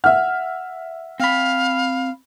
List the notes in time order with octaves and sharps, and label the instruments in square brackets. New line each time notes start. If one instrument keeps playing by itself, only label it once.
[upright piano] E5 F6 [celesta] F#5
[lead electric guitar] C4 B5 [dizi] F5